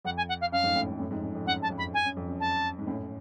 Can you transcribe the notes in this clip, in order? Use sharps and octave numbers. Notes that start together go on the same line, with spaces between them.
F2 F#5
G#5
F#5
F5
F#2 F5
F2 G#2
F#2 A2
F#2
F#2 A2
F2 G#2
F#2
F2
F#2 F#5
A5
F2
B5
G#5
F#2
F2
F#2
A5
G#2
F#2 A2